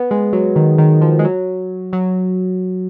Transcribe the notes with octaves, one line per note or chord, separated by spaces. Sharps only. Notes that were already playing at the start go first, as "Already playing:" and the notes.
Already playing: B3
G#3
F#3
D#3
D#3
F3
G#3
F#3
F#3